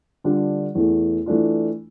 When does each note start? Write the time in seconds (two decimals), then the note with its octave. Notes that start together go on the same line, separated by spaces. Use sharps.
0.24 D3 G3 D4 F4
0.75 E2 E3 A3
1.26 E3 A3 D4 F4